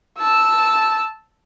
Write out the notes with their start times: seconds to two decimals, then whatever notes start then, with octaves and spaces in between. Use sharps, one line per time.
0.19 A5 E6